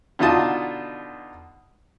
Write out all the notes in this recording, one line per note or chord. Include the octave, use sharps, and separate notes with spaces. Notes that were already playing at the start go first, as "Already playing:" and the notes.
B2 D3 D#4 F4 A5 D#6